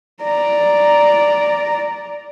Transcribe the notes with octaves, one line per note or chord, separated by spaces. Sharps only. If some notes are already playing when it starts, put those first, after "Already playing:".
D5 A#5